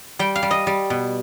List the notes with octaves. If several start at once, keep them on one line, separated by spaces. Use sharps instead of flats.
G3 G5
F5
G3
D#5
G3
B2